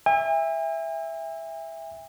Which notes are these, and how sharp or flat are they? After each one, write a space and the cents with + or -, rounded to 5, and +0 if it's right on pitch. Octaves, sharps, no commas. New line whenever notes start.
E5 +0 G#5 -45